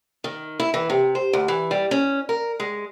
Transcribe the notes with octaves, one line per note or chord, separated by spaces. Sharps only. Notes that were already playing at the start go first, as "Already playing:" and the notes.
D#3
E4
E3
C3
C5
D2
E3
G3
C#4
A#4
G#3